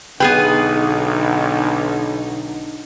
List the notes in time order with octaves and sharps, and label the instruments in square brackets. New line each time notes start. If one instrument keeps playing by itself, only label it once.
[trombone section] B1 [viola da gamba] D3 D#4 [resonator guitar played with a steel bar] B3 G#4 B4 [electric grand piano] G5